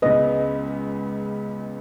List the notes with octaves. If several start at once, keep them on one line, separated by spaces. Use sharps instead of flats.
C#2 C#3 G#3 B3 B4 D#5